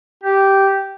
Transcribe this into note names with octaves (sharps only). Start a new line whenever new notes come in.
G4